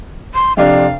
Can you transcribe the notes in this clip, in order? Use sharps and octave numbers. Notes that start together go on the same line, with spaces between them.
C6
F2 C3 D4 F5